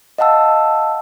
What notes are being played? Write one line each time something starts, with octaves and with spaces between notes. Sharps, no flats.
D#5 F5 F#5 A5 E6